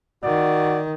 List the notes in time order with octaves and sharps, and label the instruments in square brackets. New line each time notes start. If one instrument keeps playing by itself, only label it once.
[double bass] D#3 [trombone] F#4 [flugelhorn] D5